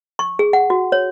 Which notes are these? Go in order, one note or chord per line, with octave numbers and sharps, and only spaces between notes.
C#6
G#4
F#5
F#4
C#5